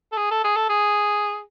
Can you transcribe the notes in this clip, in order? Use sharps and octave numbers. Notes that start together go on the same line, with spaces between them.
A4
G#4
A4
G#4
A4
G#4